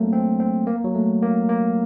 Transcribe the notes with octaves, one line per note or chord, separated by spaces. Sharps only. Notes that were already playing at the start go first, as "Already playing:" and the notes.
Already playing: F#3 A3 A#3 C4
C4
C4
A#3
F#3
A3
A#3
A#3